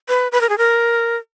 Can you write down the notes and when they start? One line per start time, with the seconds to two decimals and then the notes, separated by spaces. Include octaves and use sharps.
0.09 B4
0.32 B4
0.41 A#4
0.49 G#4
0.58 A#4